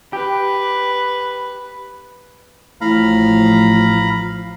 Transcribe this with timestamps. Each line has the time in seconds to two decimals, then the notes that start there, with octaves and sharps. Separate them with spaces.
0.13 G4 B4
2.81 A1 A2 F3 F5 A#5 B5